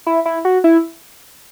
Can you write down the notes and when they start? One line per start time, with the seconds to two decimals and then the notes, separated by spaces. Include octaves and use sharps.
0.07 E4
0.26 E4
0.45 F#4
0.64 E4